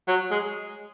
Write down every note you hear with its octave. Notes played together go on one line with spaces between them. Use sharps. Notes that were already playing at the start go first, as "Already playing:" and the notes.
F#3
G#3